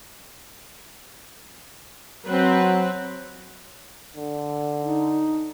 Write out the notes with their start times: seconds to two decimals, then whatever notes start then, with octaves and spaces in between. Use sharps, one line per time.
2.26 F#3 C4 B4
4.16 D3
4.83 D#4